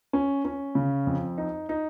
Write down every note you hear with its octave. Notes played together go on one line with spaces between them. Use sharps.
C#4
C#4
C#3
F2
D#4
D#4